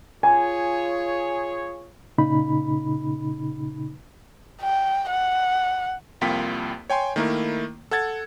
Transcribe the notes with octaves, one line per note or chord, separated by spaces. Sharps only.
F4 G#4 C#5 G#5
A#2 C#3 D#4 B5
G5
F#5
C2 F2 A#3 F4 G5 B6
C#5 G5 G#5 C6
D#3 A3 A#3 E4 A#4
A4 F#5 G#6 A6